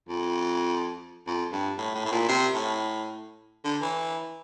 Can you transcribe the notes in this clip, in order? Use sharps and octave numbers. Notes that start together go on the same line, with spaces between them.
F2
F2
G2
A2
A2
A2
A#2
C3
A2
D3
E3